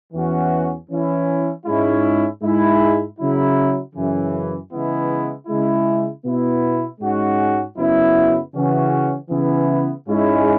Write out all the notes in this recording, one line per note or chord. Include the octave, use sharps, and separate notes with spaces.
E2 E3 C#4 F#4
E3 C#4 E4
G#2 G#3 C#4 E4
G#2 G#3 E4
C#3 F#3 E4
F#2 C#3 E3
C#3 E3 G#3 B3 E4
C#3 G#3 E4
B2 B3 E4
G#2 G#3 C#4 F#4
F#2 C#3 F#3 B3 E4
C#3 E3 C#4 F#4
C#3 E3 B3 E4
G#2 G#3 C#4 E4